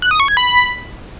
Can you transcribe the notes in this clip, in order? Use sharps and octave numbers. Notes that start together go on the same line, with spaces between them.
F#6
D#6
C#6
G#6
B5